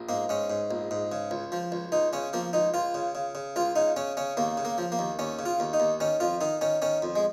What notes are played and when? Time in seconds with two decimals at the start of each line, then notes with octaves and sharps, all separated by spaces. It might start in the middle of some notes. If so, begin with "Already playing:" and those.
Already playing: A#1
0.09 G#2 A#3
0.29 G#2 C#4
0.50 G#2
0.71 A#1
0.91 G#2
1.12 C#3
1.31 C#2
1.52 F3
1.72 C#2
1.92 C#2 D#4
2.13 C#3 C#4
2.33 F3 A#3
2.53 C#2 D#4
2.74 C#2 F4
2.94 C#3
3.15 C#3
3.35 C#3
3.56 C#2 F4
3.76 C#3 D#4
3.96 C#3 C#4
4.17 C#3 C#4
4.37 D#2 A#3
4.57 C#3
4.65 A#3
4.78 F3
4.92 A#3
4.99 D#2
5.19 D#2 C#4
5.39 C#3
5.46 F4
5.60 D#2
5.74 D#4
5.80 D#2
6.00 D#3 C#4
6.20 F2 F4
6.41 D#3 D#4
6.61 D#3 C#4
6.82 D#3 C#4
7.02 F2
7.16 G#3